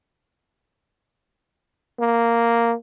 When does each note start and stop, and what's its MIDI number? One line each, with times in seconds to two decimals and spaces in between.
2.00 2.75 58